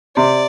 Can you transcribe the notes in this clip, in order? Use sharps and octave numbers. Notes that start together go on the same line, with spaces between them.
C3 D5